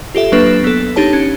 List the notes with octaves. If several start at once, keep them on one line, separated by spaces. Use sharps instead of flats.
F4 G4 A4 E5
F#3 A#3 D4 B4 C7 E7
B3 A4
D4 D#4 G4 C#5 A5
C#4